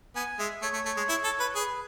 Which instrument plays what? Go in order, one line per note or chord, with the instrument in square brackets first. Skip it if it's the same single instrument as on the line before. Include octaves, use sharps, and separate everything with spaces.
[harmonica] B3 [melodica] G#5
[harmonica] G#3 [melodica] E5
[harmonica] A3 [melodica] C#5
[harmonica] A3
A3
G#3
E4
A4
B4
[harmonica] G#4 [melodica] B4